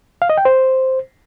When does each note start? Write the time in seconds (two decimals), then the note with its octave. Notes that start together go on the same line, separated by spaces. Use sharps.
0.22 F5
0.30 D#5
0.37 G5
0.45 C5